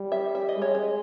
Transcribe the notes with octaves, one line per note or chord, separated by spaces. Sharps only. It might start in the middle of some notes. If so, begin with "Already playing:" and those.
Already playing: G3
E5
E5
D#5
G#3 C#5
D#5